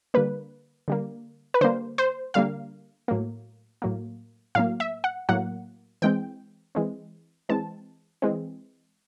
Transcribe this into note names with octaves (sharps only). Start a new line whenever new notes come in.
D3 G3 A#3 B4
D3 G3 A#3
B4
D3 G3 A#3 C5
C5
D3 G3 A#3 F5
A2 F#3 A#3
A2 F#3 A#3
A2 F#3 A#3 F5
E5
F#5
A2 F#3 A#3 F#5
E3 G#3 C4 G5
E3 G#3 C4
E3 G#3 C4 A5
E3 G#3 C4